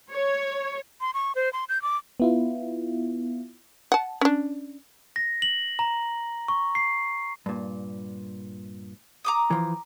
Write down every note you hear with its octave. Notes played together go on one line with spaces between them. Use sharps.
C#5
C6
C#6
C5
C6
G6
D6
B3 E4 F4
F#5 A5
C#4 D4
A#6
F#7
A#5
C#6
C7
G2 A#2
A#5 D6 D#6
E3 F3